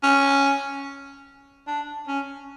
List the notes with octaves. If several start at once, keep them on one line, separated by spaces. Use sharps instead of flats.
C#4
D4
C#4